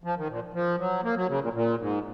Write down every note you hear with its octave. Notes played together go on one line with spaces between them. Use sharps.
F3
D#3
A#2
F3
F#3
A#3
F#3
C#3
A#2
A#2
G#2